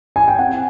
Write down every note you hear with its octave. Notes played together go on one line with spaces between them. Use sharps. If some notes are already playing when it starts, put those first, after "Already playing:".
G#5
G5
C4 F#5